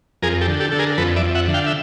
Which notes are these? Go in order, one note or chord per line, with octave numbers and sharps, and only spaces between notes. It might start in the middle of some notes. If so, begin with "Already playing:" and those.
F2 G#4 A#4
G4 A4
D3
G4 A4
D3 A4
G#4 A#4
F2 A4 B4
D5 E5
F2
E5 F#5
D3
F5 G5
E5